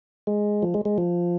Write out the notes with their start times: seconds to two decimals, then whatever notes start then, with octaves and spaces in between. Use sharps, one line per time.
0.27 G#3
0.62 F3
0.74 G#3
0.85 G#3
0.98 F3